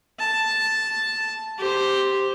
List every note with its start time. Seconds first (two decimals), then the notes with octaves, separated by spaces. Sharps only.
0.19 A5
1.58 G4 C5